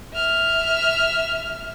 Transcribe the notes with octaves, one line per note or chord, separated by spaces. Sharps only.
E5 F6